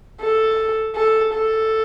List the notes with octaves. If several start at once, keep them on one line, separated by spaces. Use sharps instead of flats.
A4
A4
A4